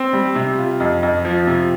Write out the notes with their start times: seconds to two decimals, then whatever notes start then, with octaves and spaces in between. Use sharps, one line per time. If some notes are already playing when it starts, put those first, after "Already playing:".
Already playing: C4
0.13 G3
0.35 C3
0.58 F4
0.80 F2
1.03 F2
1.25 F3
1.47 C3